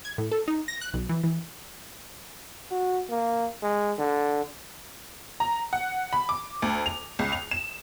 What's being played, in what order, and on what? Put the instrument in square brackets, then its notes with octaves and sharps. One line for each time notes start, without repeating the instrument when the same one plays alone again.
[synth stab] G#6
A2
A4
D#4
A#6
F#6
B1
E3
E3
[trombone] F#4
A#3
G#3
D3
[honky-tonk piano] A#5
F#5
B5
D6
D2
F7
C#2
F7
E7